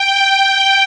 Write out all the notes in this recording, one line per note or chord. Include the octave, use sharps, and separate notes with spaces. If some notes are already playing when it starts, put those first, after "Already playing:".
Already playing: G5